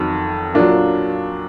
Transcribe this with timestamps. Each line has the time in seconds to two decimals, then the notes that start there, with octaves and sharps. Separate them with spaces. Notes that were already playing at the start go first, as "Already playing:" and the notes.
Already playing: F2 D#3 F#3
0.54 A#2 F#3 D4 F4